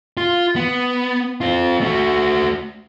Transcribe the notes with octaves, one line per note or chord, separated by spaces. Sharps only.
F4
B3
C4 F4
A3 F#4